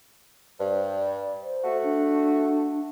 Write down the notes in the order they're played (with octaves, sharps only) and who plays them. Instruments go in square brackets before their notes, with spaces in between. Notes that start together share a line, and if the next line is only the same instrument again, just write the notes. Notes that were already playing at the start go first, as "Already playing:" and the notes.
[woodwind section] G2 [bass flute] C5
[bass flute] D5
C5
[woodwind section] A3 F#4
[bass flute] D4